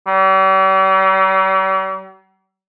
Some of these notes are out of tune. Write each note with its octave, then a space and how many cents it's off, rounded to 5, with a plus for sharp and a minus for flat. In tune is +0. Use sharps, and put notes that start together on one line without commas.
G3 -45